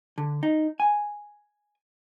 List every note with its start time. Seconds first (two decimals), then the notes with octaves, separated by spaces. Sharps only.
0.18 D3
0.43 D#4
0.80 G#5